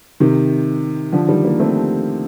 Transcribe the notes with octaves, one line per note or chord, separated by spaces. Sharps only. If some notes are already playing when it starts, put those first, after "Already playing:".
C3 D#3
D3 F3
D#3 G3
G3 A#3
A3 C4